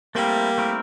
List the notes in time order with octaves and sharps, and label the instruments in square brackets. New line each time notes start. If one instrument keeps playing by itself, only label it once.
[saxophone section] G3 A#3 [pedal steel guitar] A3 C4 E4 A#4
[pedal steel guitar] A3 C4 E4 A#4